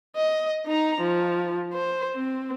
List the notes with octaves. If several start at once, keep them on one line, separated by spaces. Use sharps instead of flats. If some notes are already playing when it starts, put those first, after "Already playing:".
D#5
D#4 A#5
F3
C5
C4